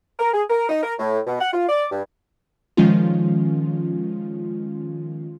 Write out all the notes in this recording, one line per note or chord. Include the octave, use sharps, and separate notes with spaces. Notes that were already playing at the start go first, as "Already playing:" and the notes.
A#4
G#4
A#4
D#4
A#4
A2
B2
F#5
F4
D5
G2
D#3 F3 G#3 C#4 F4